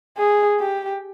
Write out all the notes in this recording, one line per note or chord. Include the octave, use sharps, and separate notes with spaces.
G#4
G4